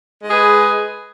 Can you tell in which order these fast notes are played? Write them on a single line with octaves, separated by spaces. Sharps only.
G#3 G#4 B4